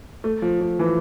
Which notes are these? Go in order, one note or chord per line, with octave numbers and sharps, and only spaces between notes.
A3
F3
F3
E3